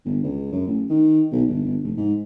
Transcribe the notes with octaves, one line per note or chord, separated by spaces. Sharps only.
G1
C#2
F#2
A1
D#3
B1
G1
G1
F1
G#2